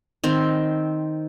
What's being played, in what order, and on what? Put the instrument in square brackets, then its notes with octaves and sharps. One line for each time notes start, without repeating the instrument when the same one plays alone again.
[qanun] D#3 C4